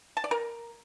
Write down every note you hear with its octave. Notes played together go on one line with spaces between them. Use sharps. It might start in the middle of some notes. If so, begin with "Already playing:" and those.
A5
D5
A#4